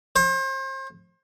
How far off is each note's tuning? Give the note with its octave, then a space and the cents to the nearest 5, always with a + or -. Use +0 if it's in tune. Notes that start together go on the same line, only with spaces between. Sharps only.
C5 +35